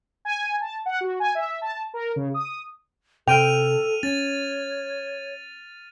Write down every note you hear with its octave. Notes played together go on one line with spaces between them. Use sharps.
G#5
A5
F#5
F#4
G#5
E5
A5
A#4
C#3
D#6
C3 A4 G5 F6 D#7 F7
C#4 C#5 A6